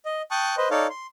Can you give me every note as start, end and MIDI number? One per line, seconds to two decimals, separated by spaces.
0.05 0.22 75
0.31 0.55 79
0.31 0.55 81
0.31 0.55 85
0.31 0.55 87
0.31 0.55 90
0.57 0.69 71
0.57 0.69 72
0.57 0.69 75
0.71 0.87 63
0.71 0.87 69
0.71 0.87 73
0.71 0.87 74
0.71 0.87 77
0.90 1.07 84